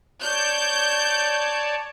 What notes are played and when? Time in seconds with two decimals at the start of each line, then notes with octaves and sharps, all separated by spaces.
0.22 C#5 D5 A5 G6